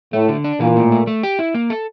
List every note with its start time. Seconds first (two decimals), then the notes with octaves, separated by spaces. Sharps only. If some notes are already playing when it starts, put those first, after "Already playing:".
0.13 A2 A3
0.29 D3
0.44 D4
0.60 A#2 E3
0.76 A2
0.92 A3
1.07 A3
1.23 G4
1.39 E4
1.55 A#3
1.70 A4